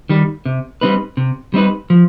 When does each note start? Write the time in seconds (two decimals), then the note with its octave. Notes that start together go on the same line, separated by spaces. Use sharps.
0.09 D#3 G3
0.45 C3
0.81 G3 C4 D#4 B4
1.17 C3
1.54 G3 C4 D#4 B4
1.90 F3